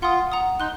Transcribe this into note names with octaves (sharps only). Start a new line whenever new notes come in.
F4 F#5 C6 D#6
F#5 A#5 D#6
D#4 C6 F#6